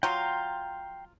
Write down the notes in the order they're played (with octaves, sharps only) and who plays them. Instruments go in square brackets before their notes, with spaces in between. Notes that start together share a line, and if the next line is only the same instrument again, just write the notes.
[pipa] F#3 F4 [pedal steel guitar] G5 A#5 C6